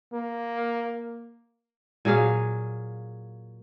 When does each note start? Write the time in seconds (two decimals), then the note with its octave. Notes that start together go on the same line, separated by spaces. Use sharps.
0.13 A#3
2.05 A#2 F#3 G#4 F5